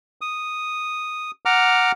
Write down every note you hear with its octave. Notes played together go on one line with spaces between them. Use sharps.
D#6
F#5 A#5 D6 F6